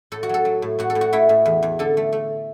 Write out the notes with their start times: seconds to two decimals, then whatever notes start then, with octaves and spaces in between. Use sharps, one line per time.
0.12 A2 A4
0.23 F#4
0.29 F#3 A4
0.45 F#3
0.62 A2
0.79 A2 F#4
0.90 A4
0.95 A2
1.01 F#4
1.13 A3 E4
1.29 A2
1.46 E2
1.63 E2
1.79 D3 A4
1.97 A3
2.13 A3